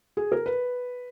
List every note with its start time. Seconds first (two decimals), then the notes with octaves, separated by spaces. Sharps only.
0.17 G#4
0.32 A#4
0.46 B4